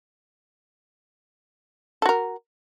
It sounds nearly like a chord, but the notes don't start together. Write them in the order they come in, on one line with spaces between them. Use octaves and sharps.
A4 F#4 A#4